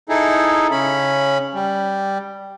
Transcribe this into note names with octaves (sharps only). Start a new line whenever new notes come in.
D#4 E4 G#4 A4
C#3 C#4 B5
G3